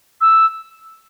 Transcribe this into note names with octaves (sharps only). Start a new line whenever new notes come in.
E6